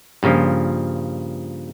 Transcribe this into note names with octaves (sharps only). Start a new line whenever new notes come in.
G2 A#2 C#3 F3